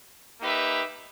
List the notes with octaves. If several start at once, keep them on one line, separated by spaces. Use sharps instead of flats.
A#3 D#4 G4 B4 E5